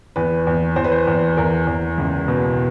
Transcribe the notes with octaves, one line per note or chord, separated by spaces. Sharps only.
E2 B4
E2
E2 C5
B4
C5
E2
E2 A#4
E2
C#2
B2